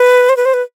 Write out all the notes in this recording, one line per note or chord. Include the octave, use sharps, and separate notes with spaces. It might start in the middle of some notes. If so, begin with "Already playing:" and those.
Already playing: B4
C5
B4
C5
B4